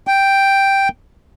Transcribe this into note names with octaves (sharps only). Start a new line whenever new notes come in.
G5